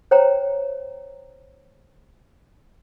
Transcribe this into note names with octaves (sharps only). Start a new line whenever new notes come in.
C5 C#5 G5 A#5